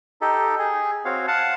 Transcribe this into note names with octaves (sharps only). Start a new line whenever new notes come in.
D#4 G4 A4
G#4
C4 F#4 C#5 F5
F5 F#5 A5